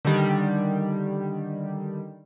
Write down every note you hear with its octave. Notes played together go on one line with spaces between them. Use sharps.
D3 D#3 G3